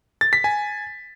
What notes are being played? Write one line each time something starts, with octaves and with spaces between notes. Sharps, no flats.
A6
B6
G#5